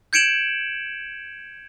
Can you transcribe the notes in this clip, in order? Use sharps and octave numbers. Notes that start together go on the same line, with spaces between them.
G6 G#6 C#7 D7 E7 F#7